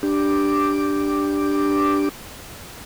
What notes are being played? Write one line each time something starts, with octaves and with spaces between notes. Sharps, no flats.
D4 G4 D6